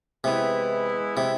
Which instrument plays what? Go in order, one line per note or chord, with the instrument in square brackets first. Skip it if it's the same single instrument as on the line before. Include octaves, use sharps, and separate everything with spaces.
[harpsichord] C3 [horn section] E3 G#3 B3 E4
[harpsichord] C3